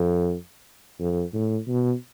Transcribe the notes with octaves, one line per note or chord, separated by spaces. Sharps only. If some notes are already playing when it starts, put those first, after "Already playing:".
Already playing: F2
F2
A2
B2